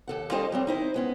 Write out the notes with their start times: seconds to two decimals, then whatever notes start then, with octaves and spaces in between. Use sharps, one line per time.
0.07 D#2 A4 F#5
0.31 G3 C#4 F4 A4 C5 D#5
0.52 F#3 G3 C4
0.67 D#4 E4 C5
0.94 G#3 B3 C#4